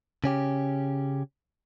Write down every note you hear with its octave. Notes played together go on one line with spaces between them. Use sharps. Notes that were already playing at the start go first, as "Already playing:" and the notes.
C#3 C#4 G4